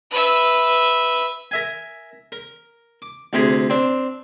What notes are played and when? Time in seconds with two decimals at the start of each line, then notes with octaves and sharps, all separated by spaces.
0.11 B4 E5
1.51 A#4 E5 G#5
2.32 A#4
3.02 D6
3.33 D2 C3 G4 G#4 A#5
3.70 C4 D4